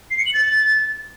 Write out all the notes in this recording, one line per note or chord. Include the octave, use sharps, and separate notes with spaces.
C7
C#7
F#7
A6